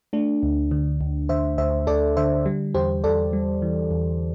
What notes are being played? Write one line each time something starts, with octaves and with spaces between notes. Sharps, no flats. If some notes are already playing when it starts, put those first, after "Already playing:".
A3 D4
D2
D3
D2
D3 C5 E5
D2 C5 E5
D2 A4 D5
D3 C5 E5
G3
E2 G4 C5
E2 A4 D5
G3
E3
E2